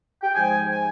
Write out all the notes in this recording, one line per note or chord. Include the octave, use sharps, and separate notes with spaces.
G5
G#2 F3 G#3 G#5
G#5